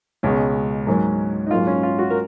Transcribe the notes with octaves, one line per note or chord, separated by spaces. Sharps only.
C#2 B2 G#3 C#4
G#2 F#3 A#3
D#4
G#2 F#3 A#3 F4
C#4
F4
F#4
A#4